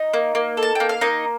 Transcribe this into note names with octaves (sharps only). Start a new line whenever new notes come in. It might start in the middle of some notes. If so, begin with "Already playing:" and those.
Already playing: D#4 D#5
A#3
A#3
A4
A5
A#3 G5
F5
A#3 D#4 D#5